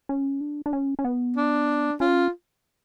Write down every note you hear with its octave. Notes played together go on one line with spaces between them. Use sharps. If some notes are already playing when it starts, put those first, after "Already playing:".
C#4
D4
D4
C#4
C#4
B3
D4
C#4 F4